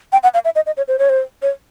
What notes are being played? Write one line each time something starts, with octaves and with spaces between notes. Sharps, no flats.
G5
F#5
F5
E5
D#5
D#5
C#5
C5
C#5
C5
C#5